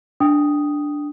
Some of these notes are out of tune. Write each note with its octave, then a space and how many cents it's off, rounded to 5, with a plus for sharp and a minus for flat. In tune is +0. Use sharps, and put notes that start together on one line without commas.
D4 +0 G5 +0 D#6 +0